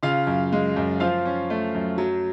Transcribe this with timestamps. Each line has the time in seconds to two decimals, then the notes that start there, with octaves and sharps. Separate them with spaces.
0.03 C#3 F4 F5
0.27 F#2
0.53 G#3
0.76 F#2
1.00 F3 F4 F5
1.25 C#4
1.50 A3
1.75 F#2
1.98 F#3